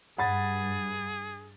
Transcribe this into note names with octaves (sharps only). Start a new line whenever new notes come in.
G2 G#4 F#5 B5 A6